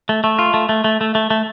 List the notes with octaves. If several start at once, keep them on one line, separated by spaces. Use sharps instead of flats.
A3
A3
F4
A3
A3
A3
A3
A3
A3